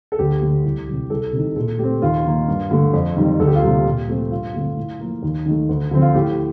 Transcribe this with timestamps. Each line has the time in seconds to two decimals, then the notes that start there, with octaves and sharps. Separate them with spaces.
0.12 A4
0.19 D2 G4
0.42 D3 A3
0.65 C2
0.88 C3 G3
1.10 C2 A4
1.33 C3 D#3
1.56 A#2 A4
1.79 A3 C4 G4
2.02 D#2 F4
2.25 D#3 A#3
2.48 G2
2.71 D3 A3
2.94 F2
3.17 D#3 G3 C4
3.39 D2 A4
3.47 G4
3.55 F4
3.62 C3 G3 A#3 G4
3.85 A#2
4.08 F3 A3 C4
4.31 G2 F4
4.54 D3 A3 C4
4.77 A2
5.00 F3 A#3
5.23 D#2
5.46 D#3 A3
5.69 D2
5.91 D3 F3 C4
6.02 F4
6.15 A2 G4